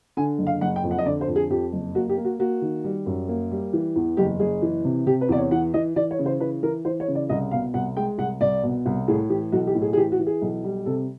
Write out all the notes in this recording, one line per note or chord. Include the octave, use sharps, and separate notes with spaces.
D3 G#5
F#1
F5
F#1 F#5
G5
F2
F#5
D#5
D3 D5
C5
F2
G#4
F2 G4
F#1
A#3 F#4
G4
A#3
F#4
A#3 F#4
D#3
G3
F#2
A#3
G3
E3
E2
F#1 G4
F#1 G#4
E3
C3
C3 G4
B4
E2 D5
C#5
E3 F#5
E3 D#5
E3 D5
C#5
C#3
C5
E3 B4
E3 A#4
E3 C5
C#5
C#3
D5
C2 D#5
B2 F5
C2 F#5
G#3 G5
C2 F#5
C2 D5
B2
C2
A2 G#4
E3 G4
B1 F#4
G4
A2
G#4
G#4
E3 G4
F#4
E3
G#4
B1
G3
C3 A4